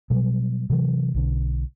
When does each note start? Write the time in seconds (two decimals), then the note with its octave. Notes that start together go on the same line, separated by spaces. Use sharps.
0.10 B2 F#3 G3
0.70 C3 E3 F#3
1.14 B1 D3